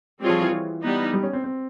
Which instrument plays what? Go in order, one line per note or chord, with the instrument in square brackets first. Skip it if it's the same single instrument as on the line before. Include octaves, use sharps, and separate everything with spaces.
[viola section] G3 C4 F4 G#4 C#5
[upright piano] F3
E3
E3
[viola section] G3 B3 D#4
[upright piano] G3
C#4
C4
C4